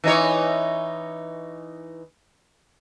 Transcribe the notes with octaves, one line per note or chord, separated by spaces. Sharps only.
E3 D#4 C#5